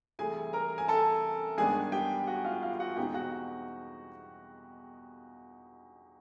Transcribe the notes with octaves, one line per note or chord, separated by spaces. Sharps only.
C2 C3 E3 A3 G#4 G#5
A#4 A#5
G#5
A4 A5
G2 D#3 G#3 B3 D4 G#4 G#5
G4 G5
F#4 F#5
F4 F5
F4 F5
F#4 F#5
E2 B2 G#3 C4 D#4 G4 G5
F#4 F#5